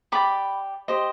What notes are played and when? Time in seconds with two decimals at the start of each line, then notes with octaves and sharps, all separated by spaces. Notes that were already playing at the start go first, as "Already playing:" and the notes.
0.12 G4 D5 B5 D6
0.88 G4 C5 D#5